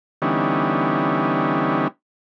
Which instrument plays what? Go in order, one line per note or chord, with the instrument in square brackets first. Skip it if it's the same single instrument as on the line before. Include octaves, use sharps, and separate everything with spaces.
[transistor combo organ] D3 E3 G3 B3 C#4 D#4